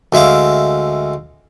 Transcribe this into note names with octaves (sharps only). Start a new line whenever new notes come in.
D2 G#3 E5 F5 D6